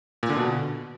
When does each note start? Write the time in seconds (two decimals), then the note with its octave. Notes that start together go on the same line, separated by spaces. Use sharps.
0.23 A#2
0.30 D3
0.36 B2